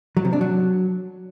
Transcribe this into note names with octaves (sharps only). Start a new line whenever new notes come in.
F#3
C3
D4
F#3